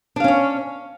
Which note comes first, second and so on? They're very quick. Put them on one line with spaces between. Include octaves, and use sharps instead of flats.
D4 F5 C#4 C#5